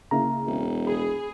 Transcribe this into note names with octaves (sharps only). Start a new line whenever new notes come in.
C#3 A#3 E4 A#5
E1
G#4 B5